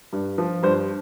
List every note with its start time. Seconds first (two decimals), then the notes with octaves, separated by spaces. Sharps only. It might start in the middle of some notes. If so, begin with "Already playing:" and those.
0.13 G2
0.38 F3
0.63 G2 C5